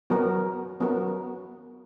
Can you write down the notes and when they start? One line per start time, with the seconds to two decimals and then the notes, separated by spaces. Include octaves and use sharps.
0.10 F#3 B3 F#4 A#4
0.80 F#3 B3 F#4 A#4